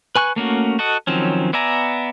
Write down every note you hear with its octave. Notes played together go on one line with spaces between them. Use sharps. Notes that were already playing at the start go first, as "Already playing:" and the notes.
B4 G#5 C#6 F#6
A3 A#3 C#4 F#4
F#4 A4 D#5 F#5
D#3 F3 F#3 C4 C#4
B3 D5 E5 G#5 A#5